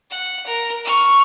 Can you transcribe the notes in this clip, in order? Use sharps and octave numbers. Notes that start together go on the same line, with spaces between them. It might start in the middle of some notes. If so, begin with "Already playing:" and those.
F#5
A#4
C#6 F6